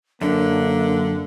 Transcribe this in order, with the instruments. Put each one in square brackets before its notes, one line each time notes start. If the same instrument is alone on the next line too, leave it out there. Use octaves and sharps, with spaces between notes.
[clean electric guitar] F#2 [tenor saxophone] D3 [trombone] A#3 [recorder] D4